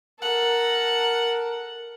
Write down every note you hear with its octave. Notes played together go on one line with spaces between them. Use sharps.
A4 A#4 F#5